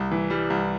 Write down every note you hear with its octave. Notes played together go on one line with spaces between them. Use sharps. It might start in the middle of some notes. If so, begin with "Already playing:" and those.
Already playing: C2
E3
G3
C2